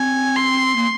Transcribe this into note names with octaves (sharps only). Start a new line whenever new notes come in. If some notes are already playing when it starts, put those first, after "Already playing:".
Already playing: C4 G#5
C6
A#3